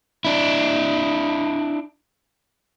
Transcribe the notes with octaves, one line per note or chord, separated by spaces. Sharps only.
D4 E4